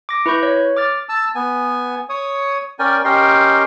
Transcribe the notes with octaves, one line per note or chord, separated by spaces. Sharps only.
D6 A#6
E4 B4 B5 C#6 G6
C#5
D6 F6 A6
A5 E6
B3 G#5
C#5 D#6
C#4 A#4 D5 G5 G#5
C#4 G4 A#4 D#5 G5 C6